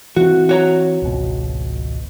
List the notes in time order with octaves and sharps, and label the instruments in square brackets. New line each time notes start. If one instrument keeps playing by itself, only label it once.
[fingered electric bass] E3 C4 [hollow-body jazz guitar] F#4
[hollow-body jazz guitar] F#4 C#5 A#5
[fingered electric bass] G#1 C#2 B2